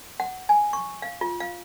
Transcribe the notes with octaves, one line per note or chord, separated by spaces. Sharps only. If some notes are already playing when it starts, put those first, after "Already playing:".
F#5
G#5
C#6
F5
F4
F5